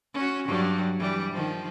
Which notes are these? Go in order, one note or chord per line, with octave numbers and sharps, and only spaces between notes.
C#4 F#4
G2 F#3 G3
E3 G3
D#3 F3